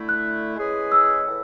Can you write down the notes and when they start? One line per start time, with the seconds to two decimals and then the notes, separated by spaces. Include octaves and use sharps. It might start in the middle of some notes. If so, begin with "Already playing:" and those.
Already playing: D3 A3 E4
0.09 F#6
0.56 G#3 C#4 E4 G#4 B4
0.92 E6
1.27 A2 E3